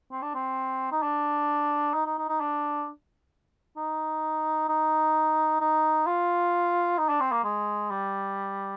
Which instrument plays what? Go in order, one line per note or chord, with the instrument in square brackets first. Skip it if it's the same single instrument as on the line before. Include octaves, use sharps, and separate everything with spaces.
[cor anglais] C4
D4
C4
D#4
D4
D#4
D#4
D#4
D#4
D4
D#4
D#4
D#4
F4
D#4
D4
C4
A#3
G#3
G3